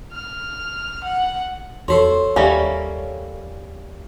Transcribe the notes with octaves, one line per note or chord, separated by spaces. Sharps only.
F6
F#5
E2 F#4 A4 C5 C#5 C6
D#2 G3 A#3 C#4 G4 E5 F5